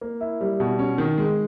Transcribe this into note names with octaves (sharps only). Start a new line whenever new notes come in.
A#3
E4
G3
B2
C#4
D#3
G#3